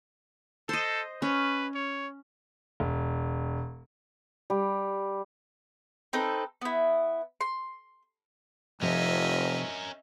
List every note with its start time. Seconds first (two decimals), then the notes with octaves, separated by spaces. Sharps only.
0.69 A4 C5 D#5
1.22 C#4 B4
1.75 C#5
2.80 E1
4.50 G3
6.13 C4 D#4 A4 B4
6.61 B3 E4
7.41 C6
8.82 F1 C3 F3 C#4 A#4 D#5 E5